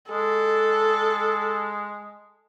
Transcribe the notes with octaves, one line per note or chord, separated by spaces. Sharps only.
G#3 A4